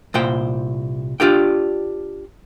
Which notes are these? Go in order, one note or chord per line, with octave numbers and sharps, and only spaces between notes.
C2 A#2 C5 G5
D4 F4 G4 D5 G5